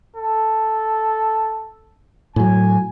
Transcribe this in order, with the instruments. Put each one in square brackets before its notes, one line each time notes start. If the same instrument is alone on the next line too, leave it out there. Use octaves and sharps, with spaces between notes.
[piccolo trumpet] A4
[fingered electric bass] A2 F#3 [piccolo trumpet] G#5